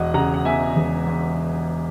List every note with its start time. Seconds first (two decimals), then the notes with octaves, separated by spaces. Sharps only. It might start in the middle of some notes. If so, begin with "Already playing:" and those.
Already playing: E1 D#5 F#5
0.14 C#3 F#5 A#5
0.34 F#5
0.45 E2 E5 G#5
0.76 E1
1.06 E2